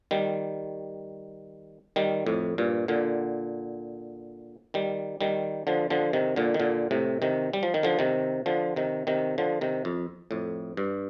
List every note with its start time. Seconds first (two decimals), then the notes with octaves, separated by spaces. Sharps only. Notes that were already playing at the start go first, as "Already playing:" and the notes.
0.11 D#3 G3
1.96 D#3 G3
2.27 F2 A2
2.58 G2 A#2
2.88 A#2 D3
4.74 D#3 G3
5.21 D#3 G3
5.67 D3 F3
5.90 D3 F3
6.13 C3 D#3
6.36 A#2 D3
6.54 D#3
6.60 A#2 D3
6.91 A2 C3
7.22 C3 D#3
7.53 G3
7.63 F3
7.74 D#3
7.83 D3 F3
7.99 C3 D#3
8.46 D3 F3
8.76 C3 D#3
9.07 C3 D#3
9.38 D3 F3
9.61 C3 D#3
9.85 F2
10.31 F2 A2
10.77 G2